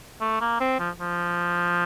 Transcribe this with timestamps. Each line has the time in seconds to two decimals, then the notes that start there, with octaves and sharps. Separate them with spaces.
0.21 A3
0.41 A#3
0.60 C4
0.79 F3
1.00 F3